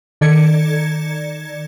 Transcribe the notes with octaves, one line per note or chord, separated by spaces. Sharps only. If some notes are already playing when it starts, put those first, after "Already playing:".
D#3 A4 D5 G#6 C#7